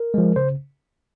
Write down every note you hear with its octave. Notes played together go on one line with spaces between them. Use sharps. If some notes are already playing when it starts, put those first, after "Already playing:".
Already playing: A#4
F3 G#3
C#3 C5